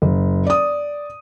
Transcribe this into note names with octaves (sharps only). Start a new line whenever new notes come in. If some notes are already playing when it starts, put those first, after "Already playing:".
F#1
D5 D#6